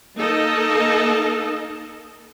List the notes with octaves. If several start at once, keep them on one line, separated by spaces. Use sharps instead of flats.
A#3 D#4 A4 A#4 D#5